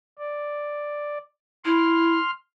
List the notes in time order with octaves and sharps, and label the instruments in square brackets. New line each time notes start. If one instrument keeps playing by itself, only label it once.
[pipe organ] D5
[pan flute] E4 [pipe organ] C6 F6